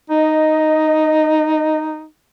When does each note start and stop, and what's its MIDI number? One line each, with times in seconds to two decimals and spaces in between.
0.10 2.06 63
0.10 1.80 75